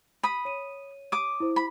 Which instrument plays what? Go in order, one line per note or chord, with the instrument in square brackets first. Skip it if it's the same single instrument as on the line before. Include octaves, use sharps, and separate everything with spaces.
[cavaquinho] B5 D#6
[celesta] C#5 D#7
[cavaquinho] D6 D#6
[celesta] E4 C5
[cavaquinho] B5